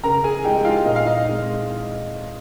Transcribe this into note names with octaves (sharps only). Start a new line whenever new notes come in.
C#3 A#4 A#5
G#4 G#5
G#3 D#4 G4 G5
G5
F4 F5
A#2 D#5
F5
D#4 D#5
G#3 C4 D#4